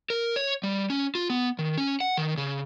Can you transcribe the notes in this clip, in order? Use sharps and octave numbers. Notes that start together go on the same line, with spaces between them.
A#4
C#5
G3
C#4
F4
B3
D#3
C#4
F#5
D#3
C#3